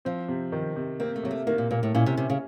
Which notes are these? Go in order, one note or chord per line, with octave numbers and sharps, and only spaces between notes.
F3 C4
C3
D#3
C3
A#3 C4
A3
C3 F#3
A3
D#3 A#3
A#2
A#2 A#3
A2
A#2 C#4
C3
C3 C#4
C#3